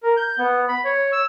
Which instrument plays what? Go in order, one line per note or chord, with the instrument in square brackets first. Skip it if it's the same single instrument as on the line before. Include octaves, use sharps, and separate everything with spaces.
[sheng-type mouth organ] A#4
G6
B3
B5
C#5
E6